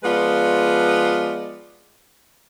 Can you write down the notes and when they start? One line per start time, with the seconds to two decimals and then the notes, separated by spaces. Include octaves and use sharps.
0.04 F3 G#3 B3 F4 B4 D5